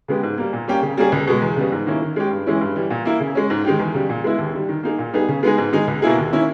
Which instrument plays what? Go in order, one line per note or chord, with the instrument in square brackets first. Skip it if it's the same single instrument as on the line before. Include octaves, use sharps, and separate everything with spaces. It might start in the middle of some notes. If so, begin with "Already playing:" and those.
[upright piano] C#3 G#3 B3 G4
G#2
G3 A#3
A#2
G3 A#3 C#4 G4
C#3
G3 A#3 C#4 G#4
C#2
B2 G#3
E2
C#3 G3 B3
G#2
D#3 A#3 C#4 E4
D#3
G#3 C#4 G4
G2
E3 G#3 C#4 E4
G2
E3 G3
A#2
A#3 E4
C#3
G#3 C#4
G#2
D#3 G#3 D#4 G4
E2
C#3 G3
A#2
G#3 B3 E4
D#2
D#3 G3
D#3
A#3 D#4 G#4
A#2
G3 B3 D#4 G#4
C#3
G#3 B3 D#4 G#4
G#2
D#3 G#3 D#4 G#4
C#2
B2 A#3 E4 G#4
D#2
D#3 A#3 C#4 E4